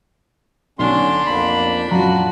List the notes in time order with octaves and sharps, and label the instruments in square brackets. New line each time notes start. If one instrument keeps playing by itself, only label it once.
[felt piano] B1 [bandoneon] D3 C6 [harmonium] C#4 [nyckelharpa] D4
[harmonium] F2 F3 A#3 [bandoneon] B5
[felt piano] F#2 F#3 A#5 [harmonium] A#2 D4 F4 [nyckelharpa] F#4